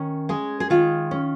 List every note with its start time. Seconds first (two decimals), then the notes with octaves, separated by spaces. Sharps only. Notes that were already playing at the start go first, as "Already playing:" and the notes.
Already playing: D#3 C#4
0.29 G#3 G#4
0.60 G#4
0.70 D#3 F4
1.11 C#4